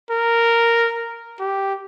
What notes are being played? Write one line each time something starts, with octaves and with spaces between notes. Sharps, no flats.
A#4
G4